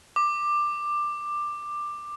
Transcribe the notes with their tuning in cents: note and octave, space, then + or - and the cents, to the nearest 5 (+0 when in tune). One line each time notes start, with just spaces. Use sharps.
D6 +15